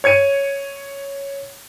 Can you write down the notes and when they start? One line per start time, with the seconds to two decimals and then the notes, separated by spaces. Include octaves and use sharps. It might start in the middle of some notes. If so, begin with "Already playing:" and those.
0.04 C#5 G#6 C#7 D#7